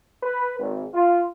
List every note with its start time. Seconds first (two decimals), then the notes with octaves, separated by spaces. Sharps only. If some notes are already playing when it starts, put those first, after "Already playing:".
0.23 B4
0.59 G#1
0.93 F4